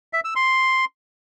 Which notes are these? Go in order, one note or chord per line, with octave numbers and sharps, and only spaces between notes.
E5
E6
C6